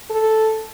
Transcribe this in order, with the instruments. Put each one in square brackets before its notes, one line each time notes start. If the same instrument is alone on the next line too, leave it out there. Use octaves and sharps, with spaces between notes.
[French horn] A4